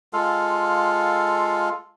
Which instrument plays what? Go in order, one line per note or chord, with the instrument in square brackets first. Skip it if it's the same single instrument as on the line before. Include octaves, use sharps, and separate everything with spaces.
[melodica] G#3 F4 A4 F5